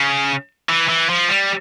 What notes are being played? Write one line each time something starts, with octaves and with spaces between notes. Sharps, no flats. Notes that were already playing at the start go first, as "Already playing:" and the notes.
Already playing: C#3
E3
E3
F3
G3